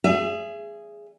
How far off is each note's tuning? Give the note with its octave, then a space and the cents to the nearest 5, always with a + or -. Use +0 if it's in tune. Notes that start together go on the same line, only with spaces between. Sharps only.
G#4 +0 E5 +35